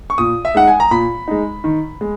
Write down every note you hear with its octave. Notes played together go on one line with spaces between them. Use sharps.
C#6
A#2 D#6
E5
G#3 D#4 F#5
G#5
A#5
A#2 B5
G#3 D#4
D#3
G#3